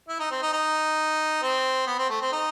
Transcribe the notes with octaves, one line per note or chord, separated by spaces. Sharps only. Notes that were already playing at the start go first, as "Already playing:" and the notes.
E4
D#4
C4
D#4
D#4
C4
B3
C4
A3
C4
D#4